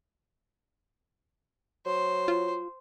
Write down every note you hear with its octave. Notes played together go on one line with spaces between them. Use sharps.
F#3 C5
F4